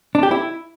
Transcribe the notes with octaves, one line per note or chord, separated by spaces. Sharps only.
D4
G4
E4